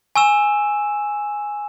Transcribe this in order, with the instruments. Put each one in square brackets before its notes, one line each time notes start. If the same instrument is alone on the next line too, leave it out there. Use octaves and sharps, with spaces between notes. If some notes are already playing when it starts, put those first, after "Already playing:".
[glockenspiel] G#5 C#6 E6 E7